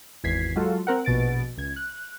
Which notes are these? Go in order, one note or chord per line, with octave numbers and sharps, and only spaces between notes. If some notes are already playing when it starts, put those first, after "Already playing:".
G#1 E2 G#6 B6 C7
F#3 G#3 F4 F#4 A4
C4 A#4 F#5
A#1 B2 A6 D7
C#2 G#6
F#6